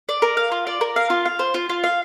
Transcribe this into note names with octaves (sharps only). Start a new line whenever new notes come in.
D5
A#4
F5
F4
D5
A#4
F5
F4
F5
C5
F4
F4
F5